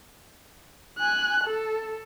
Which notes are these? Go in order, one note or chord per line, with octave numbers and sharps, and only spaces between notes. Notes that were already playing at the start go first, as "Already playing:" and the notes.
G#5 F#6
A4